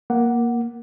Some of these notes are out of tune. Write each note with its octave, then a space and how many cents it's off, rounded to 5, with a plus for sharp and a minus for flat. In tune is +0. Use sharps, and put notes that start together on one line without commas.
A#3 +10 F#5 +0